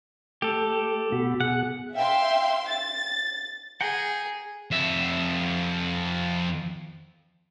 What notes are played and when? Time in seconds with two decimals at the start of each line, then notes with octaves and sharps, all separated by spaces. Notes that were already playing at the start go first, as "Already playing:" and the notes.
0.42 A3 G4 A4
1.12 B2 F#4 B5
1.40 B2 G#4 F#5
1.95 E5 F5 G5 C6
2.69 A6
3.81 G#4 F#5 G5 A#5
4.71 F2 E5